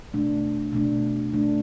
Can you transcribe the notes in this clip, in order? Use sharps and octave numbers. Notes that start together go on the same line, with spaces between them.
B2 A3 D4
B2 A3 D4
B2 A3 D4